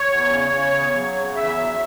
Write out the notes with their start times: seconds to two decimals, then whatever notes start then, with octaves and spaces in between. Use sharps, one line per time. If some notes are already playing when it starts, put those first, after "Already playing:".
Already playing: C#5
0.09 E2
0.31 C#3
0.52 C#3
0.73 E2
0.94 F#3
1.16 C#3
1.36 E2 E5
1.58 F#3